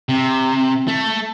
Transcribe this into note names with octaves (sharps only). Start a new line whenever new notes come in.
C3
A3